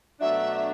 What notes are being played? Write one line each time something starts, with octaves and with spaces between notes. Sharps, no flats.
B2 F#3 A3 D4 E5